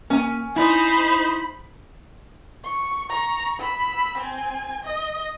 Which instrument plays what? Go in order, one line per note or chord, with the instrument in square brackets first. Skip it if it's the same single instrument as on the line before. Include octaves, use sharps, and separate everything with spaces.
[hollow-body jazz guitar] A#3 [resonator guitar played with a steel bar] C#4 G#5
[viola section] D#4 C5 [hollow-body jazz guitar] E4 [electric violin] B5
[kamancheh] C#6
A#5 C#6
B5 E6
C4 G#5
D#5